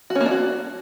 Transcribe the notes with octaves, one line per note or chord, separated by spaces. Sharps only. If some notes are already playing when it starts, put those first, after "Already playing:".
F#4
C#4
A#3
D4
F#4